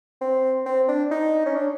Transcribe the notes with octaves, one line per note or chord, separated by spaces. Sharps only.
C4
C4
D4
D#4
C#4
D4